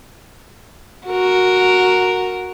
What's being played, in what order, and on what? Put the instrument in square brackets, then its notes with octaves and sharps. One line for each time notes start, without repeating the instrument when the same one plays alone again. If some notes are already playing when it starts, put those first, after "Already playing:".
[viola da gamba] F#4 A#4